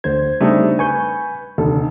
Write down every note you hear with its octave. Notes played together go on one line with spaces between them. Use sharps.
D2 D3 C5 G#6
C#3 G3 A3 C4 D4 D#4
B4 G#5 C#6 G6
F1 D#2 D3 A4